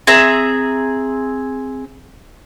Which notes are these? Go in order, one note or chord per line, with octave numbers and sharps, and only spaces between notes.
C4 G#4 E5 A#5